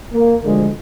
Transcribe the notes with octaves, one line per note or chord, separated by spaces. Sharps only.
A#3
D2 D3 F3 G#3